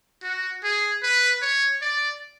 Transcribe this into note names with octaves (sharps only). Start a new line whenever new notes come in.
F#4
G#4
B4
C#5
D5